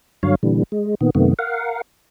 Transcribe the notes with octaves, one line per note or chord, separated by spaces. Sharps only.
G2 D3 F#3 C#5 F5
A#2 D3 E3 G3
G#3
A#2 D#3 B3
F#2 C3 D#3 A3 B3
A#4 F5 F#5